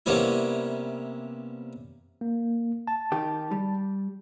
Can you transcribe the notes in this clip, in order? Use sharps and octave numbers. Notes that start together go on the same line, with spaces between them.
C3 G3 A#3 B3 C#4 E4
A#3
A5
D#3 G4
G3